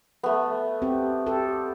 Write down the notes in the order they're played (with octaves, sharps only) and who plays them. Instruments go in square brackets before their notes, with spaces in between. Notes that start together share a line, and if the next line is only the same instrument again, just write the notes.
[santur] A3 B3
[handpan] C4 G4
G4 A4